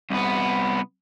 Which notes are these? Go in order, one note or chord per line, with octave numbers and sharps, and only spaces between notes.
C2 B3